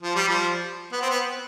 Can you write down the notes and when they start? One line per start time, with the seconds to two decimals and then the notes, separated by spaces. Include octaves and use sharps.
0.02 F3
0.15 G3
0.28 F3
0.92 B3
1.01 C4
1.10 B3